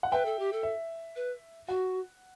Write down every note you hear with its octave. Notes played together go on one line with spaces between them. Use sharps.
F#5
B4 E5 G5
A4
G4
A4
E5
B4
F#4 F#5